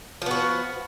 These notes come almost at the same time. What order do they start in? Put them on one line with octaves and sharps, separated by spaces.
F3 B3 F#4